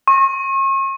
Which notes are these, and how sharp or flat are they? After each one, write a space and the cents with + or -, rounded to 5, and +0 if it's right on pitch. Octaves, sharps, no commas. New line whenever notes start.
C#6 -40